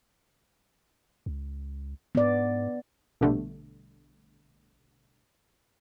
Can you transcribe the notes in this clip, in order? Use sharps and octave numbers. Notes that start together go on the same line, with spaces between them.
C#2
G#2 B3 D5
A#1 B2 D3 G3 A3